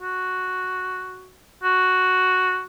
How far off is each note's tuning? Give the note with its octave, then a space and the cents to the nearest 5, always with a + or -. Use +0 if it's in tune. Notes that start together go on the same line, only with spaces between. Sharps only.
F#4 +0
F#4 +0